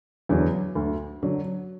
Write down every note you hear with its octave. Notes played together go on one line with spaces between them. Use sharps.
E2 D3 F#3
D2
D3 F#3